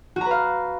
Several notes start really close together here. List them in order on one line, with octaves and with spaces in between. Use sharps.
F#4 A#5 B4 F5